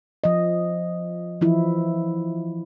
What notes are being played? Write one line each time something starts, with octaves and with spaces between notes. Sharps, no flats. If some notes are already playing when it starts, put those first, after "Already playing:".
F3 D#5
E3 F3 E4